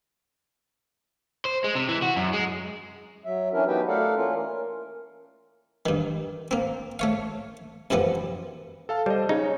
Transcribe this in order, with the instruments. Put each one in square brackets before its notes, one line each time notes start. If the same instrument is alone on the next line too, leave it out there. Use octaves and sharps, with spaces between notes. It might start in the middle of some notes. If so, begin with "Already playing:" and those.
[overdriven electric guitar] C5
G#3
C3
E3
F#4
F#2
G#3
[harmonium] F#3 E5
E3 F#3 C#4 D4 E4 A#4
B3 D#4 F#4 G4 B4 G5
A3 A4 A#4 D5 F5 F#5
E3 A#3 C#4 F4 A#4
A#4
[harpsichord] G2 D#3
A#3 C4
A3 C#5 F5
C2 F#2 F3 G3 B3
[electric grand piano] A4 F5 A5
[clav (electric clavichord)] G3 [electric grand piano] C5 D#5
[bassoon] C#3 [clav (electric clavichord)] D#4 [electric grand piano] C#5